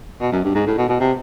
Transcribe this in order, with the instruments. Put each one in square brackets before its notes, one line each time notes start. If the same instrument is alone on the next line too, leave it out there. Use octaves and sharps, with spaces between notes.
[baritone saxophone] B2
F#2
G2
G#2
A2
B2
B2
C3